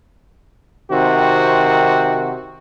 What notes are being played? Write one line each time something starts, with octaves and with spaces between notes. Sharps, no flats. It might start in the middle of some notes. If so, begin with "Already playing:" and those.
C3 D#3 C4 F#4